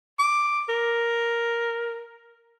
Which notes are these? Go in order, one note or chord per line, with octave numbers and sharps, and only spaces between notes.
D6
A#4